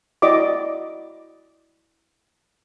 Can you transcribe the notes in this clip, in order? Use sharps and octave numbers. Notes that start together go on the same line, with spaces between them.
E4 F#4 D5 D#5 D6